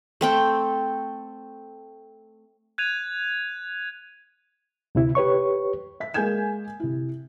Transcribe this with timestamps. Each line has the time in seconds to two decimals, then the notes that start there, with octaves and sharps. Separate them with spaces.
0.21 A3 C4 G5
2.78 F#6 G#6 D#7 F7
4.95 D2 C3 E4
5.15 G4 B4 C#5 C#6
6.00 E5 B6
6.14 G#3 A#3 G#5 G6 G#6 E7
6.80 C3 E4